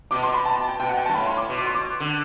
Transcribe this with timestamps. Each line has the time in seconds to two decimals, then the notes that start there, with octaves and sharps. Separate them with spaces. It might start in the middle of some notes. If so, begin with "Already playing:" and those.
0.11 B2 D6
0.23 C6
0.34 B5
0.46 A5
0.57 A5
0.68 G5
0.80 B2 G5
0.89 F#5
0.97 G5
1.06 A5
1.09 G2
1.15 A2 B5
1.26 C6
1.37 D6
1.49 B2
1.58 D6
1.66 C6
1.75 D6
2.00 D3